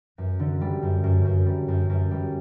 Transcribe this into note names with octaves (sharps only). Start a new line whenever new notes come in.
F#2
D3
G3
F#2
F#2
F#2
G3
F#2
F#2
G3